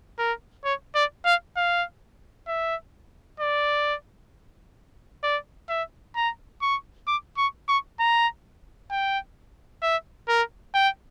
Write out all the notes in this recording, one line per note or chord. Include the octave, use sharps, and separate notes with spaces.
A#4
C#5
D5
F5
F5
E5
D5
D5
E5
A#5
C#6
D6
C#6
C#6
A#5
G5
E5
A#4
G5